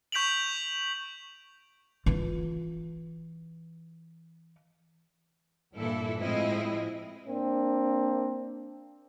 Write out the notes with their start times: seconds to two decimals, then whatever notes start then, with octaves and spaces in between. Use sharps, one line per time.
0.12 C#6 G6 B6 D7 F7 F#7
2.06 E3 F4
5.76 G2 A#2 E3 E4 A4
6.20 A2 F3 G#3 C4 E4 D#5
7.28 A#3 C4 D4